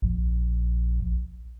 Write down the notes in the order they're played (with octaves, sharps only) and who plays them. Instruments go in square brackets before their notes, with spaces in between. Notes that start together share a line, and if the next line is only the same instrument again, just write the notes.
[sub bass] A#1